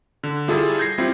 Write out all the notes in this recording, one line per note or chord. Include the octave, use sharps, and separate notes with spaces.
D3
G3 E4 F4 G#4 A4
G6 G#6 A#6 C7
G3 C4 E4 F4